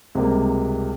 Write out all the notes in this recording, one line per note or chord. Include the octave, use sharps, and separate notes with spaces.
C#2 C3 G3 A#3